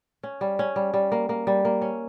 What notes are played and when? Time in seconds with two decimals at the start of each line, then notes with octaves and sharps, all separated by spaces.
0.23 C#4
0.41 G3
0.59 C#4
0.76 G3
0.94 G3
1.12 A#3
1.29 A#3
1.47 G3
1.65 A#3
1.82 C#4